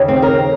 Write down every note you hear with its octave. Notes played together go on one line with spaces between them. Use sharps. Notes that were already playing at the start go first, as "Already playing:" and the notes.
Already playing: D#2 C#3
C4
A#4